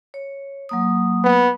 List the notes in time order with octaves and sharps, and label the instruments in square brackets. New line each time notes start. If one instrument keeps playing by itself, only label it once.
[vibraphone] C#5
F#3 A#3 D#6
[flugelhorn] B3